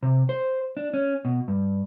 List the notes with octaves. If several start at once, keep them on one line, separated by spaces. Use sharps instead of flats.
C3
C5
D4
C#4
B2
G2